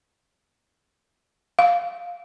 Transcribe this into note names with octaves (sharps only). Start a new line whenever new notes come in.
F5